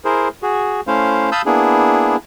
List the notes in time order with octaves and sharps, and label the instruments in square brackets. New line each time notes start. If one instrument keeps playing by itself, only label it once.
[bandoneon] E4 G#4 A#4 C5
F#4 G#4
A3 C#4 E4 C5 F5
F5 A5 B5 D#6 E6 G6
A#3 B3 D4 E4 G#4